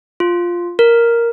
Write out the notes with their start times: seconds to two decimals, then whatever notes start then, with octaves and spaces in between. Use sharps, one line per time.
0.20 F4
0.79 A#4